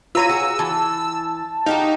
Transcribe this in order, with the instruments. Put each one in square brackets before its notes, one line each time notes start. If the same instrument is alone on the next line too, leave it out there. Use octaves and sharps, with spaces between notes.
[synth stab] F4 A#5 D#7 [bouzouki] B4 C#5 [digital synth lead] E6
[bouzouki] F#4 G#4
[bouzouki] E3 [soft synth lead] A5
[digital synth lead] D#4 [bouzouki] F#4 G4 F5